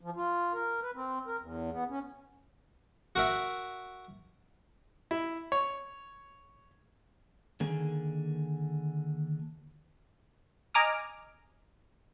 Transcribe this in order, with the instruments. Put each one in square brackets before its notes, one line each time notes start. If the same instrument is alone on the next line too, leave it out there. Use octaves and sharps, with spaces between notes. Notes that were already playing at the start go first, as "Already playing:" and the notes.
[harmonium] F3
F4
A#4
B4
C4
A#4
E2
B3
C#4
[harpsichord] F#4 A#4 E5
[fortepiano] E4
C#5
[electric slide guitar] D3 D#3 A#3 G#4
[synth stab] D#5 G#5 A#5 D6 D#6 F6